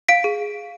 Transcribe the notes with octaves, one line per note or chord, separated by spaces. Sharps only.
F5 B6 D7
G#4